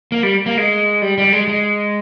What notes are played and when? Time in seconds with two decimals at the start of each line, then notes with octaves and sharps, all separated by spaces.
0.12 A#3
0.23 G3
0.46 A#3
0.58 G#3
1.02 G3
1.18 G3
1.33 G#3
1.47 G#3